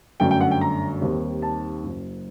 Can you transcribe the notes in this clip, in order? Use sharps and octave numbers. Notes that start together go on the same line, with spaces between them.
G1 F#2 D3 A3 G5
G5
F#5
G5
A#5
D#2 D#3 G3 C4
A5
F#1 F#2 F#3